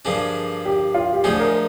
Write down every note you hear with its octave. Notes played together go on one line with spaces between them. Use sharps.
G2 D3 F3 A#3 D4 G#4
G4
F4
G4
D2 D3 F3 G#3 D#4 G#4
A#4